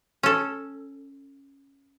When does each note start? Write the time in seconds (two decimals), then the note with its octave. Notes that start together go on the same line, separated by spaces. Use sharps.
0.23 C#4 A4